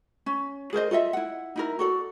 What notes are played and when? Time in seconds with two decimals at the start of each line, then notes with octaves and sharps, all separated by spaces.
0.26 C#4
0.73 G#4 A#4 C5 D#5
0.91 F4 A4 D#5 E5
1.13 E4 F#5
1.56 D#4 E4 A#4
1.79 F#4 A4 D5